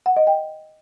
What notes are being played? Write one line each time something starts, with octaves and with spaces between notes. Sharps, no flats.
F#5
D#5
G5